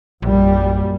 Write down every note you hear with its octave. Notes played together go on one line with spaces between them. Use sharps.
A#1 F#2 A#2 G3